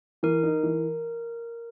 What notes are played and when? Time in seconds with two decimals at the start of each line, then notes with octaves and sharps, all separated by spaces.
0.23 E3 A#4
0.43 D#4
0.63 E3